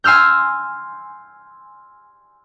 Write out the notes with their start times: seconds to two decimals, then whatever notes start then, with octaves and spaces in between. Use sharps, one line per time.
0.04 G#5 C6 E6 F6 G6